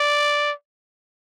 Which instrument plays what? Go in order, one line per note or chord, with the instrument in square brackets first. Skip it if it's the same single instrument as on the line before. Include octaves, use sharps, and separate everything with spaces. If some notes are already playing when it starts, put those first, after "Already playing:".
Already playing: [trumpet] D5